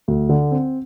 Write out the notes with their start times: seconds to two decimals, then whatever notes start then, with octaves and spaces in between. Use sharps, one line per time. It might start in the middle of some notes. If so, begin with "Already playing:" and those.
0.08 D2
0.29 D3
0.51 C4